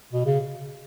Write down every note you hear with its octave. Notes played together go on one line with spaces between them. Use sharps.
B2
C#3